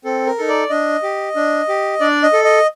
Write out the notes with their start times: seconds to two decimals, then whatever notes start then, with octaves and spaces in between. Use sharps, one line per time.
0.05 C4 A4
0.27 A#4
0.38 D#4 A4
0.48 D5
0.70 D4 D#5
1.03 G4
1.36 D4
1.68 G4
2.00 D4 D5
2.23 D#5
2.33 A4
2.44 D#5